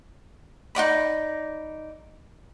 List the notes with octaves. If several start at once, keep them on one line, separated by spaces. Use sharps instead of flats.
D#4 F#4 D5 B5